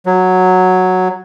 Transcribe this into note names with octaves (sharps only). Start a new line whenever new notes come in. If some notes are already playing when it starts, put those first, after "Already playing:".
F#3